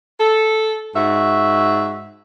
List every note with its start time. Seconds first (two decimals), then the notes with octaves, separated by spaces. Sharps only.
0.19 A4
0.95 G#2 F#4 E5